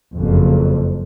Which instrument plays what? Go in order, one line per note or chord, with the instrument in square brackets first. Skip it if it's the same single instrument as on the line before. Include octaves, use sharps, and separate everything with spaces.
[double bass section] F#1 F2